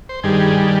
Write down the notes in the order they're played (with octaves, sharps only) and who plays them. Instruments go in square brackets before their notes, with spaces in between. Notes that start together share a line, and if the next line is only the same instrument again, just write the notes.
[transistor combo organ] C5
G2 D#3 G3 G#4